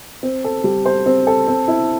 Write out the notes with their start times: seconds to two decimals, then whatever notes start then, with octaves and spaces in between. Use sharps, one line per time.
0.23 C4
0.44 A4
0.64 G3
0.86 C5
1.06 C4
1.27 A4
1.47 C4
1.68 E4